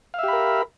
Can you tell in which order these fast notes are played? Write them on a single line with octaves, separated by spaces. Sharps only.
F5 E5 G4 B5 A#4